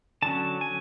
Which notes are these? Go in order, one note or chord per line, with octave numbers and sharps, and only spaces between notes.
D3 F#3 C#4 A5
G#5